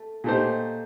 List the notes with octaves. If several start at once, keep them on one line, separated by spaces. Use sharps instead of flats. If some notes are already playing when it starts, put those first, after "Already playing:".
Already playing: A3
A#2 A3 D#4 G4 C5